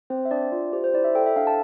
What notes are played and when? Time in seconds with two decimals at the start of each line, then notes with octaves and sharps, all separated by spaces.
0.10 C4 C5
0.25 E5
0.31 D4 D5
0.52 F4
0.73 G4 C5
0.84 C5
0.94 E4 D5
1.04 E5
1.15 A4 G5
1.26 E5
1.36 D4 F5
1.47 A5